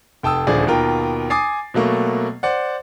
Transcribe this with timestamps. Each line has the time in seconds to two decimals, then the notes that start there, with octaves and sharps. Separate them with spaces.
0.23 F1 G5 A5 D#6 E6
0.47 D#1 D2 F3 G#4 D5
0.67 D#2 B2 F4 A#4 G5
1.30 G#5 D6 D#6 A6 C7
1.74 B2 F#3 A3 A#3
2.43 C5 D5 F#5